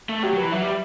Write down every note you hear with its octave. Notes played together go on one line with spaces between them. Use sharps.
A3
F#3 G4
F#3 B4
E3
F#3 E5
G3